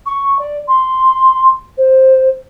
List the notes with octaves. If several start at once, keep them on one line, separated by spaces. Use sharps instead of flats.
C#6
D5
C6
C5